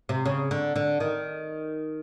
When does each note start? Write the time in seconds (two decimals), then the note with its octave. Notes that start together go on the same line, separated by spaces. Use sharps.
0.09 C3
0.26 C#3
0.51 D3
0.76 D3
1.00 D#3